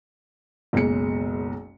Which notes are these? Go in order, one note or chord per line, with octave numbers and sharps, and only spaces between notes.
F#1 B1 G#3 C#7